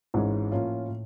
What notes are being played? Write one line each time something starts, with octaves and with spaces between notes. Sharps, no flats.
G#1 G#2 E3 G#3 C#4
A2 F3 A#3 C#4 F4
A2